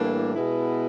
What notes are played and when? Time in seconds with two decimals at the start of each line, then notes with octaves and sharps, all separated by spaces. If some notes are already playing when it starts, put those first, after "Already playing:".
Already playing: A2 E3 G3 A#3 D4
0.34 B2 G#3 B3 E4